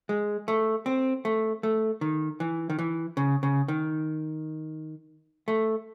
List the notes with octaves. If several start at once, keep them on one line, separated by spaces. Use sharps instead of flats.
G#3
A3
C4
A3
A3
D#3
E3
D#3
E3
C#3
C#3
D#3
A3